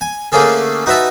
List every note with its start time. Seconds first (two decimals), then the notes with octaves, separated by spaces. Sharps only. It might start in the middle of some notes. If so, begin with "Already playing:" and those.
0.01 G#5
0.32 D3 A3 A#3 C#4 G#4 A4
0.86 D#4 F#4 B4 E5 A5